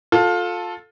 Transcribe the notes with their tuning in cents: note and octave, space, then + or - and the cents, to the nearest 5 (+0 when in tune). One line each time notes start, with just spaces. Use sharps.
F4 +25 A4 +0